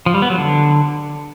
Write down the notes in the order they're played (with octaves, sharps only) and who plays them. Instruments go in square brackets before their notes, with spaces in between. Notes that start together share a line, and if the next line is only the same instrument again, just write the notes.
[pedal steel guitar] F3
G3
B3
F#3
D3